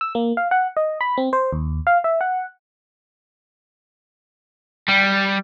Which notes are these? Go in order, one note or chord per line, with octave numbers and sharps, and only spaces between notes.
E6
A#3
F5
F#5
D#5
B5
C4
C5
D#2
F5
E5
F#5
G3